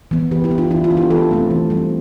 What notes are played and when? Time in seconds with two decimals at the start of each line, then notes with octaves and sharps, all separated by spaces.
0.11 E3 B3
0.31 E3 G4 B4
0.44 E4 G4
0.51 B3
0.58 D4 F4
0.71 E3 E4
0.84 D4 F4
0.91 B3
0.97 E4 G4
1.10 E3 F4 A4
1.31 A3 C4
1.51 E3
1.70 G3 C4